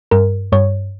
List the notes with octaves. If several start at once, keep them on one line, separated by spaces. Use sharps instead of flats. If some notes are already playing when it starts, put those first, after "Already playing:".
G2 A#4
G2 C#5